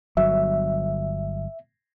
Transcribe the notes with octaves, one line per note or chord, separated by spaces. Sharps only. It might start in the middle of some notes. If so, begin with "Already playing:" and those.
G1 F#3 E5